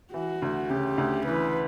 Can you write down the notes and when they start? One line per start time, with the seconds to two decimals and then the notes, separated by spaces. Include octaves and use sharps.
0.13 E3 F#4
0.42 D2
0.70 C#3 G4
0.98 D2
1.26 E3 B4